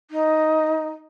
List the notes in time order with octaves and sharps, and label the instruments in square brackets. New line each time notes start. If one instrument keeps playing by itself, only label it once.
[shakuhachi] D#4